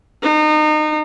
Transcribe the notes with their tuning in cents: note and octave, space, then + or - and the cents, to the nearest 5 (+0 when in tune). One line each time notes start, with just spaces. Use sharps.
D#4 -30